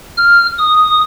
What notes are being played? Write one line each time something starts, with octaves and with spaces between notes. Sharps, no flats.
F6
D#6